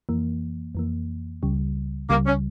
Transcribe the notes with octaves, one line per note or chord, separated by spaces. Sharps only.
F2 E3 A#3
F2 E3 A#3
C#2 C#3 G3
C#2 C#3 G3 A#3
C#4